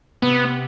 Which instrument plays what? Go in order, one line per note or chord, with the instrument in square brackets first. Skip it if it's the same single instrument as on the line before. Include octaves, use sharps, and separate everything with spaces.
[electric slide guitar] C3 [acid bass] B3